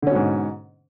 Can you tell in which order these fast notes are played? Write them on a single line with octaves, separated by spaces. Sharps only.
D3 C#4 B2 G#2